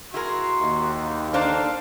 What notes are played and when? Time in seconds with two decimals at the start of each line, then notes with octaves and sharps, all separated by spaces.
0.14 E4 F#4 G#4 A#4 C6
0.61 D#2
1.33 A#3 D4 A4 C5 F5